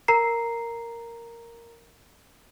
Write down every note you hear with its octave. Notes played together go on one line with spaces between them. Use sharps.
A#4 A#5 C7